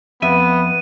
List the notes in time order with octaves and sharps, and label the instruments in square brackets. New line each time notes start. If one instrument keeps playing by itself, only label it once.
[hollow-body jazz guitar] F2 E5 [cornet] B3 [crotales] D#7